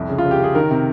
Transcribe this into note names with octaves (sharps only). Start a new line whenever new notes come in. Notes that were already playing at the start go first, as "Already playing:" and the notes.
Already playing: C2 F2
C#3
F4
C#3
G4
C#3 G#4
D#3 A#4
C3